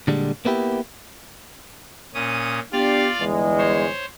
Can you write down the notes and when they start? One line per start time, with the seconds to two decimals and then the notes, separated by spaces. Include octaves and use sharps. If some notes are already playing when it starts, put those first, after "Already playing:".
0.07 A#2 D3 G3 G#3
0.45 A#3 B3 E4 G4
2.14 A#2 C#4 D#6
2.72 B3 D4 F4 G4 D5 F5
3.20 G1 E2 G#3
3.58 C5 C#5